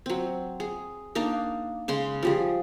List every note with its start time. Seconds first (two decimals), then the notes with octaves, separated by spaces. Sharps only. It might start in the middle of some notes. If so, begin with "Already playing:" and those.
0.06 F#3 C4
0.60 G#4
1.15 A#3 D4 D#4 F5
1.88 C#3 G#3 C6
2.23 F3 G3 G#4